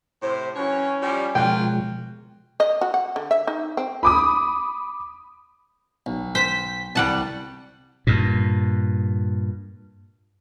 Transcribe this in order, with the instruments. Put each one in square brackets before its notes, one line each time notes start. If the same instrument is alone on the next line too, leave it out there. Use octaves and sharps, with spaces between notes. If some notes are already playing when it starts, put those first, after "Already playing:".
[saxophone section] A2 C3 [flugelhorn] C5
[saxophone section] E3 F#3 C#5 [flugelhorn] C#4 [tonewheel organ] G5
[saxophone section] F3 G3
[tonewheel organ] B2 F3 G#3 [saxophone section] F#3 A#3 F4 [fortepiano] G5
[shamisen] D#5
F#4
F#5
D3
E5
D#4
C4
[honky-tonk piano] B5 D6 D#6
[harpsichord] B1
[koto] C5 [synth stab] B6
[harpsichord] C2 [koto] G3 F#5 A5
[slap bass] G2 A#2